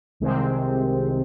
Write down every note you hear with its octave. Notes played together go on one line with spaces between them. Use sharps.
C2 C3 D#3 G#3 C4